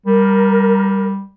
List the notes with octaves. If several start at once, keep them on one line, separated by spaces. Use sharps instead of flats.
G3 A#4